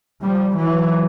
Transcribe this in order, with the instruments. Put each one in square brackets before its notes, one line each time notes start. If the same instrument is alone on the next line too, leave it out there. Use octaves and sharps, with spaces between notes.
[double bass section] F3 G3
E3 F#3